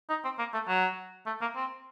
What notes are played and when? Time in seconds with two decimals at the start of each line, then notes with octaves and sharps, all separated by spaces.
0.09 D#4
0.24 C4
0.38 A#3
0.53 A3
0.68 F#3
1.26 A3
1.41 A#3
1.56 C4